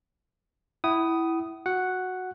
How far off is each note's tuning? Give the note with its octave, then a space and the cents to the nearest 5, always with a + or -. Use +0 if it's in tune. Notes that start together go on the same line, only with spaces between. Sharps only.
E4 +0 F#5 +40 D#6 +0
F#4 -10 F#5 +0